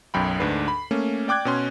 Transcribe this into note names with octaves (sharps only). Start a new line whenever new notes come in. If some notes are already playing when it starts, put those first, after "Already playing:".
B1 F#2 G5 B5
D2 G#2 D4 B4 C7
B5
A3 A#3 C#4
D5 G5 D6 F#6 G#6
B2 C#4 C6